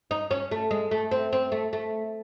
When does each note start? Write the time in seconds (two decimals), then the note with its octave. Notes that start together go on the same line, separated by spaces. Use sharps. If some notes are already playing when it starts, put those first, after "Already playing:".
0.11 D#4
0.31 C#4
0.51 A3
0.71 G#3
0.91 A3
1.11 C4
1.33 C4
1.52 A3
1.73 A3